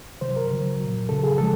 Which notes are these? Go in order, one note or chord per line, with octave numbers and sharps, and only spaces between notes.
C3 D#3 F#3 C5
A#4
C#3 F#3
A#2 F#3
C#3 F#3 A4
G#4
C#3 F3 G#3 A4